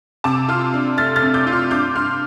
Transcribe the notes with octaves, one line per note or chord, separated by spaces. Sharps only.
C3 A5 D6
F4 C6 F6
D4
A3 F6 A6
F6 A6
C3
D6 G6
F4
C6 F6
G2 D6 G6
G2 C6 F6